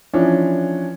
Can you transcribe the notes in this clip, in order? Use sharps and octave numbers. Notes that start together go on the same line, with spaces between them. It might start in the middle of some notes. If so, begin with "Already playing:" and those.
E3 F3 C#4 D4